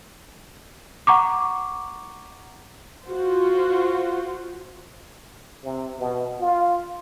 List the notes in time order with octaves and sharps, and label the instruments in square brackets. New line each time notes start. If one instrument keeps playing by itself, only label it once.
[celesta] F#5 A#5 C#6 D6
[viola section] F4 F#4 C5
[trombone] C3
B2
F4